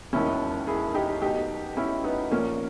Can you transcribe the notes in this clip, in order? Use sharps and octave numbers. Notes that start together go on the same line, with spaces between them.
E1 D#2 D#3 C#4 E4
E4 G#4
D#4 G4
B1 B2 D#4 G4
C#4 E4
B3 D#4
A#1 A#2 A#3 C#4